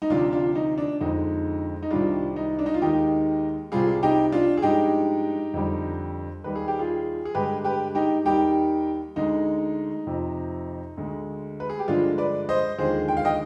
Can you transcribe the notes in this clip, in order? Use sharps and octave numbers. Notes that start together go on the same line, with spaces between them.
D#4
D2 C3 F3 D4 F4
D4 F4
D#4
D4
F2 D3 G#3 D#4
D#4
C2 C3 D#3 G3 D4 F4
D#4
D4
D#4
F4
D#2 D#3 G#3 D#4 G4
C2 C3 G3 F4 G#4
D#4 G4
D4 F4
G#4
G2 F3 G#3 D#4 G4
F2 D3 G3
D#2 D#3 G3 B4
G#4
G4
F4 G#4
G#4
G2 D3 G#3 G4 B4
G4 B4
D#4 G4
D#2 D#3 G3 D#4 G4
D2 D3 G#3 D#4
F2 C3 F3
D2 D3 G#3
B4
G#4
G4
G2 D3 F3 G#3 D4 F4
B4 D5
C5 D#5
D#2 D3 F3 G#3 G#4 C5
G5
F5
D#5 G5